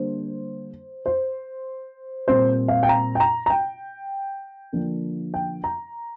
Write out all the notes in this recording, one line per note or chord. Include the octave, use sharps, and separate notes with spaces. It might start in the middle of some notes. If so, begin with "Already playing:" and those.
Already playing: D3 G3 A#3 D4 C5
C5
A#2 G3 C4 C5
F5
G5
A#5
G5
A#5
A#5
G5
D3 F3 A#3 D4
G5
A#5